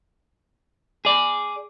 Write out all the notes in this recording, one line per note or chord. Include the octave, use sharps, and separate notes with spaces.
G#4 D5